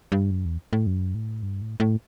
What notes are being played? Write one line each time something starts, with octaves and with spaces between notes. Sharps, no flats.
G2
F#2
E2
A2
F#2
A2
G2
A2
A2